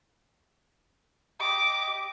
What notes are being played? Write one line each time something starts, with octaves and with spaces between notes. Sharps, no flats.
G4 D#5 D6 D#6